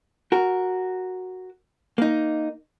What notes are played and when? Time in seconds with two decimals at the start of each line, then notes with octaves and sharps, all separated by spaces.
0.32 F#4 A#4
1.98 A#3 D#4